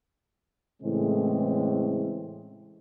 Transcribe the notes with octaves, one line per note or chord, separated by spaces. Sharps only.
A2 C#3 E3 G#3 A3 C4